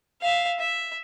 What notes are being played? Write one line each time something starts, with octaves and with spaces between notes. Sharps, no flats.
E5 F5
E5